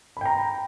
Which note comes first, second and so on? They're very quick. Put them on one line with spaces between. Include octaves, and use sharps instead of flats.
B5 G5 A#5